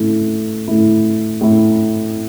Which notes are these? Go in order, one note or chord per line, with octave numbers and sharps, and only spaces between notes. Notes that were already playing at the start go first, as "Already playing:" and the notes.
Already playing: A2 A3 E4
A2 A3 E4
A2 A3 E4